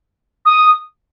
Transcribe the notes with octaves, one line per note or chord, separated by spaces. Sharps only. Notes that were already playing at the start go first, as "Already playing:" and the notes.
D#6